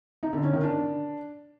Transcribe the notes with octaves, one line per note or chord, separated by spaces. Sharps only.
D#4
D3
C#4
D#3
D4